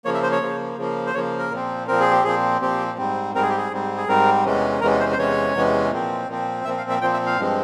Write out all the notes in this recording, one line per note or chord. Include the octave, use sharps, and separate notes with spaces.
C#3 F3 A#3 C#5
E5
C5
C#5
C#3 F3 A#3
C#3 F3 A#3
C5
C#3 F3 A#3 C#5
A#4
A#2 F3 C4
A#2 F3 C4 A#4
G#4
G4
A#2 F3 C4 G#4
A#2 F3 C4 G4
G#2 G3 C4
G#2 G3 C4 A#4
G#4
G4
G#4
G#2 G3 C4
G#4
G#2 G3 C4 A#4
E2 C3 E3 G#3 C#4
E2 C3 E3 G#3 C#4 A#4
C5
C5
E2 C3 E3 G#3 C#4 C#5
E2 C3 E3 G#3 C#4
A#2 F3 C4
A#2 F3 C4
A#2 F3 C4 E5
F5
E5
A#2 F3 C4 G5
E5
F5
G2 F3 G#3 C4